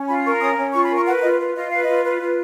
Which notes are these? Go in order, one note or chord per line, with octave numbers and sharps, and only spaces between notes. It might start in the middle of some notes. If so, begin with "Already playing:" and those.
Already playing: C#4
F4 B5
A#4 C#6
C#4 D#6
C#4
F4 C#6
B5
A#4
C#6
B4 F#5
F4 D#5
B4
F4 D#5
B4 F5
D#5
F4
B4
F4